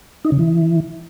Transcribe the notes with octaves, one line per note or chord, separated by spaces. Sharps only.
D#4
C#3
E3